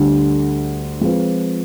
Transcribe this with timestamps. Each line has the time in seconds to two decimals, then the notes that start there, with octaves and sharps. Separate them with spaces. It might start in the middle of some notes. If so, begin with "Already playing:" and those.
Already playing: D2 D3 G3
1.01 F3 G#3 C4 F4 B4